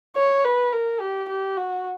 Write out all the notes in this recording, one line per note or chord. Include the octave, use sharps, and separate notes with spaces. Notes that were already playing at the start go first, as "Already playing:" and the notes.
C#5
B4
A#4
G4
G4
F#4